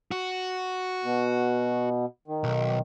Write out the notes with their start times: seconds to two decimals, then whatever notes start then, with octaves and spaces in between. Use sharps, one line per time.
0.11 F#4
1.04 B2
2.28 D#3
2.44 B1